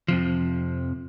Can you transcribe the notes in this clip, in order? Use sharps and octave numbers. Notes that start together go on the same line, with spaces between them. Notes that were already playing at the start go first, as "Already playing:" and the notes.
F2 C3 F3